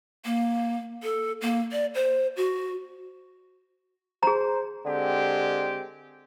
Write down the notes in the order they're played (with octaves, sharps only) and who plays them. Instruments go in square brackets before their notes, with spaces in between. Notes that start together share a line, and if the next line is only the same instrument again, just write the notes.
[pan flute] A#3
A4
A#3
D5
C5
F#4
[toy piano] G#4 A#5 [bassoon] C5
[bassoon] D3 [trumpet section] G#3 C4 G4